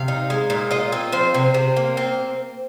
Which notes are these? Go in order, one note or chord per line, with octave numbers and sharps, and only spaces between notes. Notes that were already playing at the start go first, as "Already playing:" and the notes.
Already playing: C3 F5
D#4
G#3
A#2
F4 D#5
C4
F3 C5
C3
C3
A#3
C4